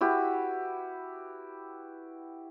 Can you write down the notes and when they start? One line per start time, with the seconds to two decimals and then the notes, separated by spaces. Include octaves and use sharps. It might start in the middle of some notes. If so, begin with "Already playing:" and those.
0.01 E4 F#4 G4 B4